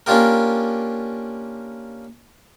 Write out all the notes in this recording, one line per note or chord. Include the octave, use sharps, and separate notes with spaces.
A#3 C#4 D4 F4 G4 A#4